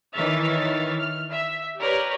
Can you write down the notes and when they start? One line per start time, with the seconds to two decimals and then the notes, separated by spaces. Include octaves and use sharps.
0.13 D#3 E3 C#5 E5 F6 A6
0.99 F6
1.30 E5
1.80 G4 A#4 B4 C#5 D5